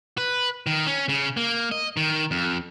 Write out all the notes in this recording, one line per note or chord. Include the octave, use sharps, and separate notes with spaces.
B4
D#3
C#4
C#3
A#3
D#5
D#3
F2